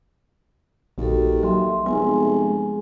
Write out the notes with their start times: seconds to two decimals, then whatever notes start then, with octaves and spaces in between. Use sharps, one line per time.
0.98 A#1 D#2 F#4 A4
1.43 F#3 E5 C6
1.86 F1 G#3 B3 G#5
2.46 G#3